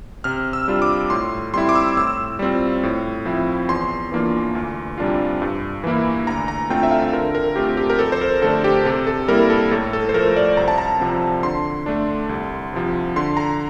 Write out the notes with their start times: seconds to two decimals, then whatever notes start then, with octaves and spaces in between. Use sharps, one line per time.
0.24 C3 F6
0.53 E6
0.68 G3 D4 F4
0.82 D6
1.10 A2 C6
1.54 G3 C4 E4 C6
1.69 D6
1.75 E6
1.97 A2 E6
2.39 G3 C4 F4
2.83 A2
3.25 F3 C4 E4
3.69 E2 C6
4.12 E3 A#3 D4 F4
4.55 D2
4.98 C3 G3 D4 F4
5.42 G2
5.84 E3 A#3 E4
6.27 D2 A#5
6.48 A#5
6.70 D3 A3 C4 F4 G5
6.83 E5
6.91 F5
7.13 D3 A#4
7.35 A#4
7.56 A3 C4 F4 G4
7.77 G4
7.90 A#4
7.99 F2 A4
8.12 C5
8.21 A#4
8.42 D3 A3 D4 A4
8.64 G4
8.85 C3 A4
9.07 A4
9.28 G3 A#3 E4 A#4
9.50 A4
9.71 A2 A4
9.93 A4
10.09 C5
10.14 F3 A3 A#4
10.36 D5
10.57 C2 A#5
10.68 A5
10.78 A#5
11.00 C3 F3 C4
11.43 D3 C6
11.86 A3 D4
12.29 C2
12.73 C3 F3
13.16 D3 C6
13.37 A#5